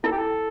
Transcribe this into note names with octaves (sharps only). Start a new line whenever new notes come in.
E4 A4
G4
A4